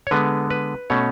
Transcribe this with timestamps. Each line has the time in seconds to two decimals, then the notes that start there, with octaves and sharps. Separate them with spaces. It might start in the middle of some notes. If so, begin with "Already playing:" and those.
0.07 C#5
0.11 D3 G#3 B3 B4
0.51 B4
0.90 B2 A3 C#4 C#5